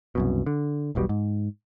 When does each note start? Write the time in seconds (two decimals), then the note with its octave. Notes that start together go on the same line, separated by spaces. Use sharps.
0.15 C2 F#2 B2
0.46 D3
0.95 E1 B1 B2 G3
1.09 G#2